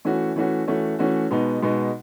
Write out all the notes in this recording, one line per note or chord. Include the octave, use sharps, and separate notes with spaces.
E3 A3 C#4 F#4
E3 A3 C#4 F#4
E3 A3 C#4 F#4
E3 A3 C#4 F#4
B2 G#3 B3 D#4
B2 G#3 B3 D#4